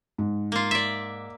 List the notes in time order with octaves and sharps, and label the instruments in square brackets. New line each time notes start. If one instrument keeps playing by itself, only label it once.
[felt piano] G#2
[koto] A#3 F4
D5 E5